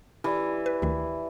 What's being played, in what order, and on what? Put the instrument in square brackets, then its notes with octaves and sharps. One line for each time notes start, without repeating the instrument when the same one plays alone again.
[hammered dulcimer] E3 [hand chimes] G4 D5
[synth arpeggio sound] B4
D2 D#3